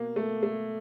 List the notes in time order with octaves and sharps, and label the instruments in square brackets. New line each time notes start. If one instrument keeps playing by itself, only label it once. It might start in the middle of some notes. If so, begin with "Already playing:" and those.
Already playing: [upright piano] B2 A#3
A3
A3